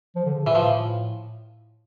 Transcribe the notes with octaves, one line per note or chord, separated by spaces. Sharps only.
F3
D3
C#3
A#2 E3
A2 F3